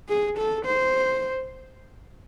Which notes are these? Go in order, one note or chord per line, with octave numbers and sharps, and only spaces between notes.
G#4
A4
C5